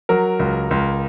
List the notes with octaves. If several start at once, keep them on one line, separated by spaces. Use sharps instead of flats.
F#3 A#4
C#2
C#2